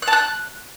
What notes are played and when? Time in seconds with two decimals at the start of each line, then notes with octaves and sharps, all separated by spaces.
0.02 F#6
0.07 A5
0.13 F#6